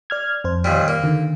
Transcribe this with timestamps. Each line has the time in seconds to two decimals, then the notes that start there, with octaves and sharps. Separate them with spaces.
0.10 D5 F6 G#6
0.44 F2 C5
0.64 D#2 A#2 G3
0.88 A#3
1.04 D3 D#3